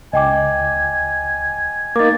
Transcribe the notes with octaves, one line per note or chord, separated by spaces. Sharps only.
C#2 D#5 G5 G#5 D6
A#3 D#4 D6 A6